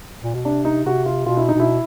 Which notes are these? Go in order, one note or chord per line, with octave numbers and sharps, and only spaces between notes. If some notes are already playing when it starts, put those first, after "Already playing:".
A#2
B2
C3 D4
D#4
C3 F#4
F4
B2 F4
E4
D#4
B2
E4